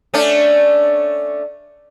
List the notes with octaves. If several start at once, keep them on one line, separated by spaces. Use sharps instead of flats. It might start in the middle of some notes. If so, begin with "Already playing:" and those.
A3 C#4 D4